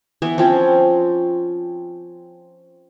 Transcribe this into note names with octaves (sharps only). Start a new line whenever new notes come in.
E3 B3 E5
F3 C4 C#4